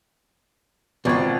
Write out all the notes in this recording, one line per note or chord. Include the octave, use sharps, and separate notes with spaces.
G#1 B2 C4 F4 D5